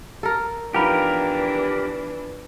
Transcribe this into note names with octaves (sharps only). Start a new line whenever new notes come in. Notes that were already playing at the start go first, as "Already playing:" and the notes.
A4 A#4
E3 F3 B3 D4 D#4 G4 A#4